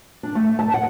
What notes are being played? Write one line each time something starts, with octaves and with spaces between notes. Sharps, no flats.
D4
A3
A5
F#5